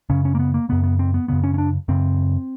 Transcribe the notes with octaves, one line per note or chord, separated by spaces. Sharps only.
F#2 C#3 C#4
C#4
A#3
B3
A#3
F#2 C#3 B3
B3
C4
B3
F#2 C#3 B3
C#4
C#4
D4
F#2 C#3 C4